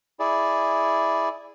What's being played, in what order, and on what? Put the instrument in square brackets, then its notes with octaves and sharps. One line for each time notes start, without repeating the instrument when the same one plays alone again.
[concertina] E4 G#4 D5